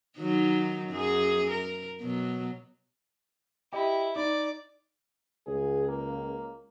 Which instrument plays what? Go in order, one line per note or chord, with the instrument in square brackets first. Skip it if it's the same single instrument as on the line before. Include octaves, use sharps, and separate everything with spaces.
[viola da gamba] D#3 F#3 D#4
F#2 G#4
A#4
B2 F#3
[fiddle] E4 [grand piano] G4 D#5
[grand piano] D#4 [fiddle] D5
[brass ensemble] C#2 [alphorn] G#4
[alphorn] A#3